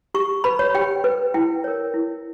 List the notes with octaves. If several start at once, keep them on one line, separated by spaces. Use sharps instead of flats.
G4 C#6
B4 B5
C#5
G4 G5
B4
E4 G5
A#4 C#5
E4